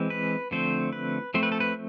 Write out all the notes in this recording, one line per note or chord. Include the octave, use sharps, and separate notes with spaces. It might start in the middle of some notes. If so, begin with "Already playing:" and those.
Already playing: E3 G#3 C4
B4
D3 F3 A3 C4 C5
B4
F3 A3 C4 C5
B4
A4
B4